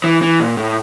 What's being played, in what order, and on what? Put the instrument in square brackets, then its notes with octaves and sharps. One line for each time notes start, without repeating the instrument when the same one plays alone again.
[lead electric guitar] E3
E3
A#2
A2